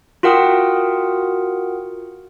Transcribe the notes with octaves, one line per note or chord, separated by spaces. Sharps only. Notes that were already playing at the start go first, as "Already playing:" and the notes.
F4 F#4 A#4 F#5 G5 D#6